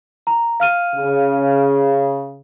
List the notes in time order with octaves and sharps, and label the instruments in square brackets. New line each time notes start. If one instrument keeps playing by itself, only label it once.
[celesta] A#5
F5 F6 D#7
[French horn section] C#3